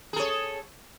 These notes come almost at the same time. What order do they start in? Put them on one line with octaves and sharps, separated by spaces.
G#4 A4 C#5